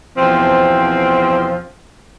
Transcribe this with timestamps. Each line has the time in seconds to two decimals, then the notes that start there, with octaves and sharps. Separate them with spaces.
0.18 E2 B2 F3 C4